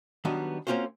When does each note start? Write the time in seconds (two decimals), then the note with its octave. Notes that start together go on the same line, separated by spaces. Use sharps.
0.25 D#3 F#3 G3 B3 D4 D#5
0.67 A#3 C4 C#4 F4 F#4 C5